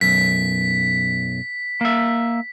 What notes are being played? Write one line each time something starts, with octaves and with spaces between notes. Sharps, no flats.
B1 F#2 B6
A#3 E5